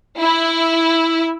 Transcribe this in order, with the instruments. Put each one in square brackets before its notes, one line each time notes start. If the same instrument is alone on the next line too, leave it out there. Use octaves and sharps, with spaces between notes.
[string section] E4